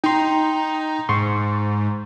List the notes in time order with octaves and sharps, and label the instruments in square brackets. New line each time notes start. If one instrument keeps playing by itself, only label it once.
[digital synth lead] D#4 [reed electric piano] G5 A#5 C6
[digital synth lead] G#2 [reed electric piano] C6 C#6